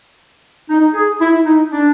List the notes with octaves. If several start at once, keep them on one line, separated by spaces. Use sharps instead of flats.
D#4
G#4
E4
D#4
D4